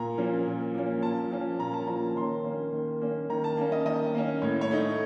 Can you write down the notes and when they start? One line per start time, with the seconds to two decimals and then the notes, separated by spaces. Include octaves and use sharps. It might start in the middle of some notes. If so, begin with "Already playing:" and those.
Already playing: A#2 A#5
0.18 F3 A#3 C#4
0.47 A#2
0.75 F3 A#3 C#4
1.03 A#2 A5
1.31 F3 A#3 C#4
1.60 A#2 A#5
1.73 A5
1.87 F3 A#3 C#4 A#5
2.16 D#3 C6
2.44 A#3 C#4
2.73 D#3
3.01 A#3 C#4
3.29 D#3 A#5
3.44 A5
3.57 A#3 C#4
3.72 D#5
3.85 D#3 D#5
4.15 A#3 C#4
4.42 A2 C#5
4.61 C#5
4.71 A3 D#4